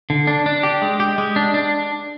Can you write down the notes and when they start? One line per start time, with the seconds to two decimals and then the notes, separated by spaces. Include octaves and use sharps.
0.10 D3
0.27 D4
0.46 D4
0.63 G4
0.82 G#3
1.00 G4
1.18 G#3
1.36 D4
1.54 D4